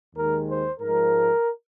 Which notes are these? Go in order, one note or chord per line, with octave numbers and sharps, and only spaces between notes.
D#2 D#3 G#3 A#4
C5
G#2 F3 G#3 A#4